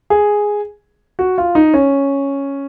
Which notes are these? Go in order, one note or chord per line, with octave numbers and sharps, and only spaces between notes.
G#4
F#4
F4
D#4
C#4